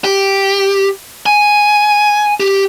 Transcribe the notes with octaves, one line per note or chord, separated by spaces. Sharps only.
G4
G#5
G4